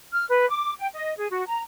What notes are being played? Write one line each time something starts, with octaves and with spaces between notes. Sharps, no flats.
F6
B4
D6
G5
D#5
G#4
F#4
A#5